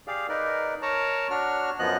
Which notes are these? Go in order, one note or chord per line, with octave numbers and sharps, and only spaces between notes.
G4 G#4 D5 F5
D#4 A#4 B4 D5
A#4 C#5 A5 A#5
D4 F#4 C#5 F6
F#2 F3 B3 D#5 F#6